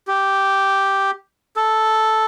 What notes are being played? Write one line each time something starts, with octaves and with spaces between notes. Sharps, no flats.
G4
A4